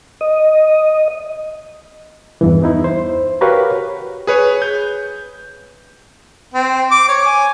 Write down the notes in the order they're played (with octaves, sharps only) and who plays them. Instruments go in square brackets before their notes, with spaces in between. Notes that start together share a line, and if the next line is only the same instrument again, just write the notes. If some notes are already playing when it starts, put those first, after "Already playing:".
[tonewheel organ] D#5
[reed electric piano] E2 G2 E3
B3 D#4 E4
C5
F#4 G4 A#4 B4 C#5 F5
[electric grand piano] G#4 B4 C#5
G6
[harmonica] C4
D6
C#5
G#5